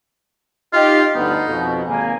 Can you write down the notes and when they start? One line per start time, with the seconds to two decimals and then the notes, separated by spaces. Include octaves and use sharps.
0.73 D#4 F4 G4 D#5
1.15 G1 D2 B3 D#4
1.47 F2 B2 F3
1.87 G#1 A#3 G#5